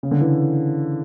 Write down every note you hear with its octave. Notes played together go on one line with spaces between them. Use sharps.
C#3
D3
E3